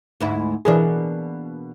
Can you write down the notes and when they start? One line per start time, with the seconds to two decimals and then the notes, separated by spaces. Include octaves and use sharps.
0.20 D2 G#2 E4
0.65 B2 E3 A#3 D4 G#4